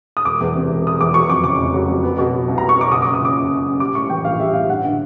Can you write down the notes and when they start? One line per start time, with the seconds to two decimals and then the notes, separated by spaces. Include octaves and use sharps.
0.17 D#6
0.25 E1 D6
0.41 E2
0.55 C3
0.70 E1
0.85 E1 D#6
1.00 E2 D6
1.14 F#3 C#6
1.29 F2 D6
1.44 C#3 D6
1.59 F1
1.74 F#3
1.88 F2
2.03 B3
2.18 B2
2.33 F#3
2.48 C2
2.58 B3 A#5
2.69 C#6
2.77 B2 D6
2.92 F#1 D#6
3.02 F#2 D6
3.14 D#6
3.21 C#3 D6
3.37 F#1
3.50 F#1
3.66 F#2
3.80 G3 D6
3.95 A2 C#6
4.10 E3 G5
4.25 A#1 F5
4.40 G3 E5
4.54 A2 F5
4.69 G2 F#5
4.84 D3